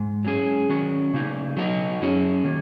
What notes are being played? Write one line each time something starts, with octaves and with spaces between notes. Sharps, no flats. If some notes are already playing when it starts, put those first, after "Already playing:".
Already playing: G#2
F#3 C#4 G#4
D#3 F#3 C#4 F#4
C#3 A#3 D#4
F#3 D#4 F#4
F#2 F#3 C#4 G#4
D#3 A#3